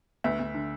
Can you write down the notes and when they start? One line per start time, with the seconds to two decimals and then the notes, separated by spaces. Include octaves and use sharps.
0.24 D2 B4 E5
0.39 D2
0.54 D3